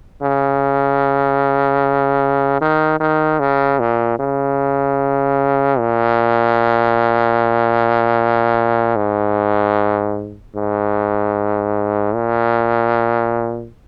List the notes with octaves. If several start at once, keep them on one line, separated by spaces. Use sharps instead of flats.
C#3
D#3
D#3
C#3
A#2
C#3
A#2
G#2
G#2
A#2